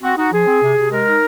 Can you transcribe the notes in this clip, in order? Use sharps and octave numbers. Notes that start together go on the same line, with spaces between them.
C4 F#4
D#4 F#4
F3 G#4
C4
C3
C3
G#3 A#4
D#4